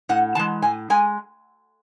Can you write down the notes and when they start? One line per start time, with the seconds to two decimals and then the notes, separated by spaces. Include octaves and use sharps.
0.09 A2 F#5
0.35 E3 G#3 A5
0.62 A2 G#5
0.90 G#3 G#5